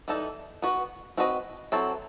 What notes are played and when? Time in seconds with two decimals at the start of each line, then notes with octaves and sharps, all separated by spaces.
0.08 E3 G3 D#4 A4
0.62 B3 F#4 B4
1.17 C4 F#4 B4 D#5
1.72 F#3 C4 E4 A4